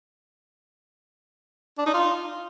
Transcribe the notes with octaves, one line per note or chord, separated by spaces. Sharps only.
D4
D#4
F4